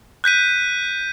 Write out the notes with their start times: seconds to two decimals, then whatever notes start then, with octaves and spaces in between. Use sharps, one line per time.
0.24 F#6 G6 B6 D#7